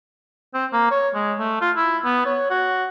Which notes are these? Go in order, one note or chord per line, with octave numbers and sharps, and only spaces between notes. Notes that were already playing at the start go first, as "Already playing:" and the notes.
C4
A#3
C#5
G#3
A3
F4
E4
B3
C#5
F#4